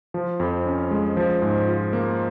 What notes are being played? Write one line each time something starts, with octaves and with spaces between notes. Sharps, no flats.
F3
F2
C#4
G#3
F3
G#2
F4
A#3